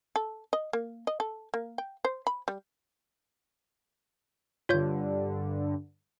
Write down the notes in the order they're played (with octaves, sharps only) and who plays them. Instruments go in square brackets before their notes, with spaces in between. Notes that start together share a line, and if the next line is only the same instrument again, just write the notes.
[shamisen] A4
D#5
A#3
D#5
A4
A#3
G5
C5
B5
G3
[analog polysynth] G2 D3 [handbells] F4 C#5 G6